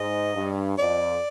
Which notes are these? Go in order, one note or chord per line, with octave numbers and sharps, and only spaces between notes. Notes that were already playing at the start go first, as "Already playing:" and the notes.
Already playing: G#2 D#5
G2
F2 D5